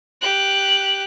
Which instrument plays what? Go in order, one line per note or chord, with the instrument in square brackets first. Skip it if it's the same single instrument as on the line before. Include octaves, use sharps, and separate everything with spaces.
[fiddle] G4 F#6